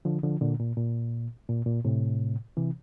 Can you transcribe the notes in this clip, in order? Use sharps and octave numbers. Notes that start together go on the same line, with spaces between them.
D3 F3
D3 F3
A#2 D3
A#2
A#2
A#2
A#2
A2 C3
C3 E3